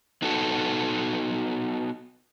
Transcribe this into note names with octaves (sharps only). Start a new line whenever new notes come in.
B3 D#4 F#4 A4